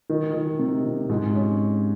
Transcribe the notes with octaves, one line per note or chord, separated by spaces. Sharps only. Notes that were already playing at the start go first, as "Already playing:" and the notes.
D#3
D#3
C3
C3
G#2
C#4